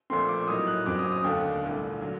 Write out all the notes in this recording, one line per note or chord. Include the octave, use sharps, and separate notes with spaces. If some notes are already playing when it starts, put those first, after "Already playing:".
A#1 A#2 A3 C4 C6
D6
A2 F#3 A#3 D#4 D#6
F#6
F#1 F#2 F#3 C4 D6
D#6
D#6
D#2 D3 A3 D4 G5
C2 A#2 A3
D3 F#3